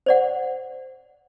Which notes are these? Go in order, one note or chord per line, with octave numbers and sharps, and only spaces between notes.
C5 D5 F#5